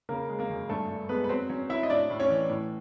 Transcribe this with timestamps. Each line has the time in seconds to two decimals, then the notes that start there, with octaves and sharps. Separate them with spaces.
0.09 C#3 A#3 A#4
0.29 G#3
0.39 A#3 A#4
0.49 F#2
0.69 G2 A3 A4
0.89 G2
1.09 G#3 B3 B4
1.24 B4
1.29 F#3 C4 C5
1.49 F#3 C#4 C#5
1.69 F#3 E4 E5
1.83 D#5
1.89 A2 D4 D5
2.10 A2
2.20 C#4 C#5
2.30 E3
2.49 A2